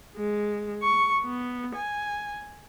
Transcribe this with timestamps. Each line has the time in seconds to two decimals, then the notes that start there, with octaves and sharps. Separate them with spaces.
0.16 G#3
0.83 C#6
1.24 B3
1.75 G#5